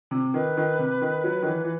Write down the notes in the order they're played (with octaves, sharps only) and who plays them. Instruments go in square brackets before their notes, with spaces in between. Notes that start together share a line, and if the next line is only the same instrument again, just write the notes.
[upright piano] C3
[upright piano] D#3 [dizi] B4
[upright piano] D#3
C3
D#3
F#3
D#3
E3
E3